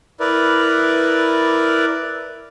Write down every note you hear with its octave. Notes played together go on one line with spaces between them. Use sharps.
E4 A#4 B4 D5